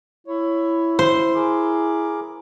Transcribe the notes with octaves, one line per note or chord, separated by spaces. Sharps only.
E4 C#5
C5
G#4 A#4 D6